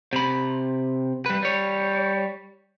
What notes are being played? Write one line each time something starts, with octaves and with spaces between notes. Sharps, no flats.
C3 B5
G3 B4
G3 C#5